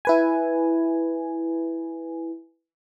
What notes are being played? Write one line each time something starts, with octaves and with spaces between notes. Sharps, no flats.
E4 B4 G#5